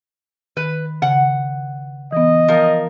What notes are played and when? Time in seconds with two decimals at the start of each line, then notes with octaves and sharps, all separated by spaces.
0.57 D#3 B4
1.02 C#3 F#5
2.12 E3 B3 D#5
2.48 F3 A#4